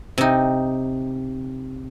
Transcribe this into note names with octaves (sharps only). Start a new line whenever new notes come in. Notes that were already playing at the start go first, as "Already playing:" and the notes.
C3 D#4